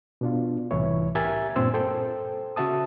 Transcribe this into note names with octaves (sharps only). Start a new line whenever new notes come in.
B2 D4 F4
C2 A2 E3 E4 C#5
G4 A#4 E5 G#5 G#6 A6
G2 A#2 C4 C6 E6
A4 C5 G5
C#3 F#4 E5 A5 D#6